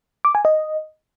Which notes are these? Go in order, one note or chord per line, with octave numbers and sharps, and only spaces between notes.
D6
G#5
D#5